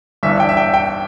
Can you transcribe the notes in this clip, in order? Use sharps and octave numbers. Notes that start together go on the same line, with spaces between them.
G1 G2 E3 E5
G5
E5
G5
G5